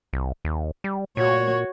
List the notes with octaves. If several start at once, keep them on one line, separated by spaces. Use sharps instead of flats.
C2
D#2
G3
A#2 F#4 C#5